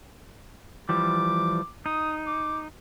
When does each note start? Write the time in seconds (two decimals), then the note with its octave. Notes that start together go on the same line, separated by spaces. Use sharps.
0.89 E3 F3 G3 D6
1.86 D#4 D#6
2.27 D6